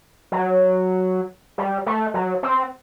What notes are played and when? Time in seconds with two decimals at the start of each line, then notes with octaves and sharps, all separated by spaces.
0.32 F#3
1.58 G3
1.86 A3
2.14 F#3
2.43 C4